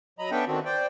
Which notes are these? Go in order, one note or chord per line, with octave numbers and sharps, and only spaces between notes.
F#3 D#5 A#5 B5
B3 C#4 D4 A4 E5 G5
D3 D#3 C4 D4 F#4
C5 D5 G5